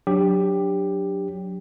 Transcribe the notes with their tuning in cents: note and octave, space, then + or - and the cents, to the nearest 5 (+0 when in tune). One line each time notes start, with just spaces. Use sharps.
F#3 +0 D4 +0 G4 +10